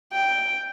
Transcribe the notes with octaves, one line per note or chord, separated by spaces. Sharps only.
G5